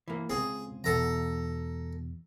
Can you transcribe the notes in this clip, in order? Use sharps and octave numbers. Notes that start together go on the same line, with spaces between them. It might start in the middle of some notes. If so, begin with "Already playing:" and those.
E3 A#3
C#2 C4 G#4
E2 B2 A4 A#5